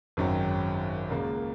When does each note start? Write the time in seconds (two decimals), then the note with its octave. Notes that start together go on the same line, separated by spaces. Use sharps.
0.17 G#1 F#2 D#3 F#3
1.10 C#2 C#3 A#3